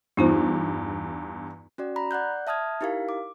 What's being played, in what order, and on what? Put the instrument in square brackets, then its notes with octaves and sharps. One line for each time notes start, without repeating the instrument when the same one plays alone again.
[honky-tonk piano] E2 G2 [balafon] D#4 F4 C5
[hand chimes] C#4 F#4 D5
A#5 B5
D5 F#5 F#6 G6
E5 A5 D#6 F6 G#6
D#4 E4 G4 A#4 F5
D6